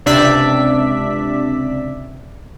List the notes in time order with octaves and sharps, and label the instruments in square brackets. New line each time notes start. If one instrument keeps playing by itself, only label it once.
[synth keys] C#2 C3 D4 D5 E5 B6